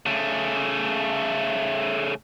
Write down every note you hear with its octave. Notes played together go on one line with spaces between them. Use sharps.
C#3 A3